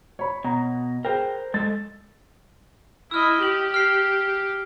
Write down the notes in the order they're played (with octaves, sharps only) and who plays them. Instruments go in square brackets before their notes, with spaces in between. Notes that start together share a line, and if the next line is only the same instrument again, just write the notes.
[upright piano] C#5 B5
[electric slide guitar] B2 [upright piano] A#5
[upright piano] G#4 G5 [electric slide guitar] A#4 C5
[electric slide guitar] G#3 A4 [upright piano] A6
[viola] E4 D#5 [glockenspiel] E6 F6
[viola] G4 [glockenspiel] F#7
[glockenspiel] F6 C7